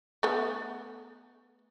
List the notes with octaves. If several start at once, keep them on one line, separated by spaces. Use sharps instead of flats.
A3 B3